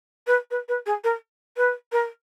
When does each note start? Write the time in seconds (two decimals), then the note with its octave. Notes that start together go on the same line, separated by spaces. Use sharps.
0.27 B4
0.50 B4
0.68 B4
0.86 G#4
1.04 A#4
1.57 B4
1.92 A#4